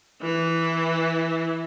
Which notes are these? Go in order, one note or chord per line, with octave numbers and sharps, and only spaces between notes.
E3 E4